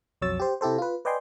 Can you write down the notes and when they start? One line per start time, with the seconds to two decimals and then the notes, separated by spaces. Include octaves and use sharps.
0.22 B1 F2 F#3 C#5 E6 A6
0.40 G4 C5
0.61 C3 E4 G4 A4 C5
0.78 F4 B4
1.05 B4 D5 D#5 G5 G#5 C6